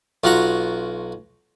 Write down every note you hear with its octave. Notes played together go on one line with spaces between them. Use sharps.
B1 F4 F#4 F#5 A#5 C#6